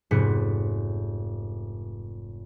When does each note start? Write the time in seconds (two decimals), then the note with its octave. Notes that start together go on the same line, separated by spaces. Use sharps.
0.11 F1 G#2 B3 B6 C#7